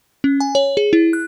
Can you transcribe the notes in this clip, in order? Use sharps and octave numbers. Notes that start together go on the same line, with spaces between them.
C#4
G#5
C#5
G#4
E4
F#6